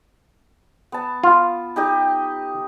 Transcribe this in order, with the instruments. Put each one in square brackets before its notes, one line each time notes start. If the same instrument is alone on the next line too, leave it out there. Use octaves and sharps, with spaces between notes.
[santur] B3 A5
[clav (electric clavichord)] F4
[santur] D#4 G4 D#5